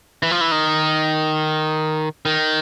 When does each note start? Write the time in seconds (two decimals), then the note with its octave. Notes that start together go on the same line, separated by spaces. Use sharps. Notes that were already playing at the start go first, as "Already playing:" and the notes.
0.23 E3
0.31 F3
0.41 E3
0.51 D#3
2.25 D#3